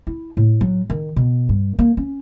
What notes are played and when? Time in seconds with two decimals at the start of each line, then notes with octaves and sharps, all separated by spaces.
0.07 E4
0.37 A2
0.61 F#3
0.90 D#3
1.16 B2
1.49 G2
1.79 A#3
1.97 C#4